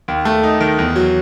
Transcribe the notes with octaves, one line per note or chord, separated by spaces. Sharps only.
D#2
A3
D#4
D#3
E2
F#3